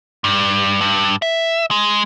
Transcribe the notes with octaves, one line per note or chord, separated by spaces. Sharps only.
G2
G2
E5
G#3